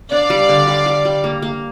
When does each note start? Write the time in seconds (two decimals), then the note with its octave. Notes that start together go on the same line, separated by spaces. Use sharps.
0.11 D4 D5 F5
0.30 G3
0.49 D3
0.67 G3
0.86 G3
1.05 G3
1.24 A#3
1.42 A#3